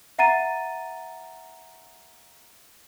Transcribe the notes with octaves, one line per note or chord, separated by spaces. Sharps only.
E5 F#5 A#5 A6 D#7